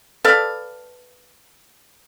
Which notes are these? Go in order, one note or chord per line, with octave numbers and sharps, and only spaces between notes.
A4 B4 D5 F5